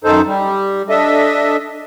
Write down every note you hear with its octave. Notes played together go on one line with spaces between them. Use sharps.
F#2 D#3 D#4 A4 C5
G3
D4 A4 D#5 E5